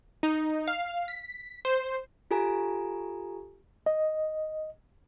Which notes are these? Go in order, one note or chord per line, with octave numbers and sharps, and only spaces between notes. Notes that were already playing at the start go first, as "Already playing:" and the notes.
D#4
F5
B6
C5
F4 G4 A4 G#5 A#5
D#5